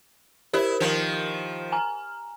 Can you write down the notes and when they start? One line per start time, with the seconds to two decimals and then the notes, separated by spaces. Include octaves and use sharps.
0.53 E4 G4 A#4 C5
0.80 D#3 F3
1.72 G#5 A#5 F6